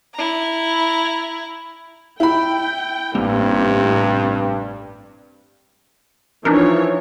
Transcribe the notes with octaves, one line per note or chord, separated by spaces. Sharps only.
E4 A#5
E4 G5 B5
A1 G2 C3 A#3 C4
E3 F3 D4 D#4 A#4 C#5